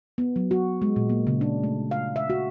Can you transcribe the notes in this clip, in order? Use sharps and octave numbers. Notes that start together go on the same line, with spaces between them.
B3
F#3
F#4
G#3
A#2
A#3
C#3
D4
A3
F5
E5
F#4